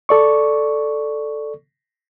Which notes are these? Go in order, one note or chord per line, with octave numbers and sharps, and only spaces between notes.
A4 D5 C#6